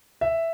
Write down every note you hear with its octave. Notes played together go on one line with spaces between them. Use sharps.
E5